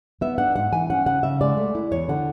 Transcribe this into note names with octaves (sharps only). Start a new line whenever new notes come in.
B3 E5
D4 F#5
G#2 F#5
E3 G#5
C#4 F#5
C#3 F#5
C#3 E5
G#3 D5
A3
E4
E2 C#5
D3 F#5